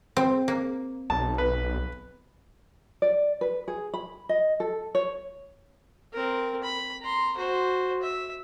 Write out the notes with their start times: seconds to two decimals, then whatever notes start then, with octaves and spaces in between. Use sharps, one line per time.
0.17 C4
0.48 A#3
1.10 B1 A5
1.38 B4
3.02 D5
3.41 B4
3.68 G#4
3.94 B5
4.29 D#5
4.60 A4
4.95 C#5
6.13 C4 A#4
6.63 B5
7.01 A#5 C6
7.37 F#4 C5
8.02 E5